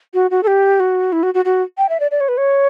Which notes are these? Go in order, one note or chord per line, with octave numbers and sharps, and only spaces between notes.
F#4
F#4
A4
G4
F#4
E4
F#4
F#4
F#4
G5
E5
D5
D5
C#5
B4
C#5